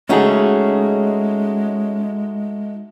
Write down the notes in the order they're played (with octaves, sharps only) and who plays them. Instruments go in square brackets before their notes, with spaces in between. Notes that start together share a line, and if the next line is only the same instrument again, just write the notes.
[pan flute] G#3 [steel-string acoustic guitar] A3 D#4 F#4 [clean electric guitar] C#4 G#4